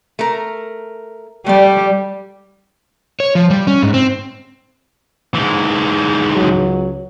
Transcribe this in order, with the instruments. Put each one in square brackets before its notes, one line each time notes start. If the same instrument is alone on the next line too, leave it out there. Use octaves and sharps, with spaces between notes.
[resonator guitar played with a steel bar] A3 A#4
[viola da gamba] G3 [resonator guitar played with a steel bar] A3 D5
[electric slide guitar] C#5
F3
G3
C#4
G#2
C4
[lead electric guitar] G#2 E3
[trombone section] C#2 F#3